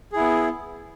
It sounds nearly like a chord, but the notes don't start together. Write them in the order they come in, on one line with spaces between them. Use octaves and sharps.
G#4 E4 B3